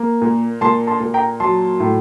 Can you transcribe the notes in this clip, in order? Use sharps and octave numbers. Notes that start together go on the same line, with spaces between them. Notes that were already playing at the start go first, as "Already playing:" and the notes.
Already playing: A#3
A#2
A#2 A5 C6
A5 C6
A#2
G5 A#5
F#3 A5 C6
A2